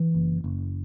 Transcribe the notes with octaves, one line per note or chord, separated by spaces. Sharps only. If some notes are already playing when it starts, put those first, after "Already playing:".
Already playing: E3
F#1
F#1